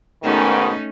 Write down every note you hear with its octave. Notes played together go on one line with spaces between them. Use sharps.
G#2 B2 D#3 A3 C#4 D#4